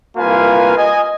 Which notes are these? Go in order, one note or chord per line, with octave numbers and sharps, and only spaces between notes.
C2 A#3 F4 B4 F5 G#5
D#5 G#5